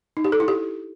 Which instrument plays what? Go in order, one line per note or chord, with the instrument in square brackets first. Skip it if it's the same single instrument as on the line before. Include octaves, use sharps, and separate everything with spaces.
[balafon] D#4
G4
A4
E4
G4